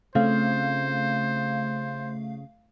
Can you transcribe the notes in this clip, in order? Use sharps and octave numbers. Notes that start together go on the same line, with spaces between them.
C#3 A3 C4 F4 C5 F5